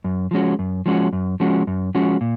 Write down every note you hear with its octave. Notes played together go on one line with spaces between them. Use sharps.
F#2
F3 G#3 C#4 F#4
F#2
F3 G#3 C#4 F#4
F#2
F3 G#3 C#4 F#4
F#2
F3 G#3 C#4 F#4
A#2